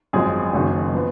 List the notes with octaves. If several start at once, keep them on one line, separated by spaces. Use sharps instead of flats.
G#1 F#2 F3 G#3 G#4
F#1 F#2 D#3
F3 B3